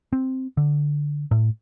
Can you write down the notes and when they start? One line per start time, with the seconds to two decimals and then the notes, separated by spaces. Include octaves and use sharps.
0.13 C4
0.57 D3
1.31 A2